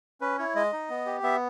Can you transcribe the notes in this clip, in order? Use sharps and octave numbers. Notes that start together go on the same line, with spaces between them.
C#4 B4
E4 C#5
G#3 D#5
D#4
B3
G4
B3 E5